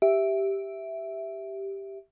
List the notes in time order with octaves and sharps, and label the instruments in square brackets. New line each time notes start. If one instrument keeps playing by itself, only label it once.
[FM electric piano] G4 E5